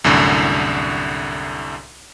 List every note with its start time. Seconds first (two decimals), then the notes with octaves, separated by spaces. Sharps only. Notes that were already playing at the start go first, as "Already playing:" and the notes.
0.04 C2 F#2 A2 D3